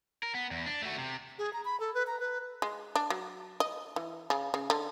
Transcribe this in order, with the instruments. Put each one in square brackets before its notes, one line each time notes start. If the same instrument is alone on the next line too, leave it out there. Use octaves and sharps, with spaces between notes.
[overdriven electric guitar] A#4
B3
E2
D4
A3 F#4
C3
[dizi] G#4
A#5
B5
A4
B4
A#5
B4
[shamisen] G#3
D4
F#3
D#5
E3
C#3
C#3
D3